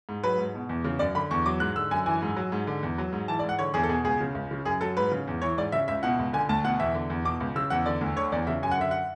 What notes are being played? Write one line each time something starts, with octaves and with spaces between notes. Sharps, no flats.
G#2
F#3 B4
G#2
B2
E2
C#3
F#2 D5
D3 B5
E2 C#6
F#3 D6
G#2 F#6
D3 E6
F#2 G#5
E3 G#5
G#2
F#3
G#2
D3
E2
F#3
G#2
E3 A5
D5
G#2
F#5
D3 C#5
E2 G#4
A4
B2 G#4
C#2 G#4
C#3
C#2
C#3
F#2 G#4
F#3 A4
G#2 B4
C#3
E2
E3 C#5
G#2 D5
C#3 E5
C#2 E5
B2 F#5
C#2
D3 G#5
D2 A5
B2 F#5
E2 E5
D3
E2
B2 D6
C#2
C#3 E6
E2 F#5
D3 D5
D2
D3 C#5
E2 D5
C#3 E5
F#2 G#5
F#5
D3 E5
F#5